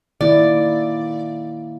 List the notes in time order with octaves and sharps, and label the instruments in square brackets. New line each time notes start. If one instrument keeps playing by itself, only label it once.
[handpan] D#3 A#3 E4 [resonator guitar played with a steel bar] D5